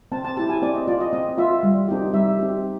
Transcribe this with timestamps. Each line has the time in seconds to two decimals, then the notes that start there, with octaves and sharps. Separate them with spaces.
0.12 C4 A5
0.25 A5
0.37 E4 G4 A5
0.50 G#5
0.62 C4 D5
0.75 D#5
0.88 F4 D5
1.00 D#5
1.13 C4 D#5
1.38 F4 E5
1.63 G3
1.88 C4 D#4 G4
2.13 G3 E5
2.39 C4 D#4 G4